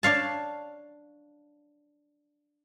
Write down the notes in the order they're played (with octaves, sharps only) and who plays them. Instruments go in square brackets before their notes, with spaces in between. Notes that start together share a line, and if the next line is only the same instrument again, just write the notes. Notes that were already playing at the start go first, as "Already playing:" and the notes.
[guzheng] D4 C#5 F5 A5